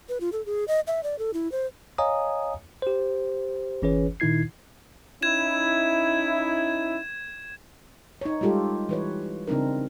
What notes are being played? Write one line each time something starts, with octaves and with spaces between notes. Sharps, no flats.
B4
F4
A4
G#4
D#5
E5
D5
A4
E4
C5
C#5 D#5 F5 G#5 A#5 D#6
G4 C5
G1 E3 C#4 G#4 B4 C#5
A#2 D#3 D#4 E4 G#6 C7
C#4 D#4 E4 G#6 E7
D#4 C#5
G3 G#3 F4 G4 A4
E3 B4 C#5
C#3 C4 D4 D#4 A#4